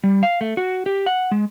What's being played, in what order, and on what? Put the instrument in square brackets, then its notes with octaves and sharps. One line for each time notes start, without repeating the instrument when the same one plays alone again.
[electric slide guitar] G3
F5
A3
F#4
G4
F#5
G#3